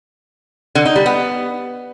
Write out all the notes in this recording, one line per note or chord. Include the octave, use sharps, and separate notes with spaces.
D3
D#4
G3
B3